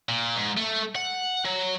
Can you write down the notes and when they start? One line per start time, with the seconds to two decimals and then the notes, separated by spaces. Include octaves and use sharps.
0.09 A#2
0.36 G#2
0.57 A3
0.95 F#5
1.45 F#3